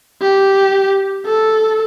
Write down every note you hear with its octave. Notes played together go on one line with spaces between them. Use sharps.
G4
A4